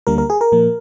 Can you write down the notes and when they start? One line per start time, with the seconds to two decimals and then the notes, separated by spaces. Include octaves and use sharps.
0.07 D2 D3 G3 A#3 A#4
0.18 A#4
0.30 G#4
0.41 A#4
0.52 A#2 F3 A#3